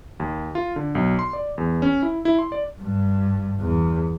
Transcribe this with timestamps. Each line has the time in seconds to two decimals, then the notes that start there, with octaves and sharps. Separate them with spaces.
0.20 D#2
0.55 F4
0.76 D3
0.95 B1
1.19 C6
1.33 D5
1.58 E2
1.82 C#4
2.02 E4
2.25 E4
2.39 C6
2.52 D5
2.82 G2
3.61 E2